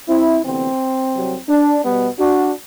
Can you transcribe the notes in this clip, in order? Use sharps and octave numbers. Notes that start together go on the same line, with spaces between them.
C4 E4
D2 C3 E3 B3 C4
C2 C3 F#3
D4
B2 G3 B3
D4 F#4